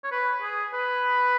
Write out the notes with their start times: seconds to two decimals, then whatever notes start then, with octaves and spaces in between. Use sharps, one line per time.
0.04 C#5
0.11 B4
0.42 G#4
0.73 B4